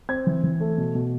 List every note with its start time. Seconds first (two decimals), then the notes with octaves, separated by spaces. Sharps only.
0.09 C4 G#6
0.27 E3
0.43 E3
0.60 A3
0.78 B2
0.95 B2